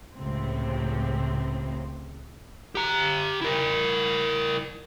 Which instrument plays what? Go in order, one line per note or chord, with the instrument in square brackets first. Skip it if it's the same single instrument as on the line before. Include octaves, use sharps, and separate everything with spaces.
[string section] C#2 A2 C3 C4
[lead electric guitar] G4 A#5
E4 A#4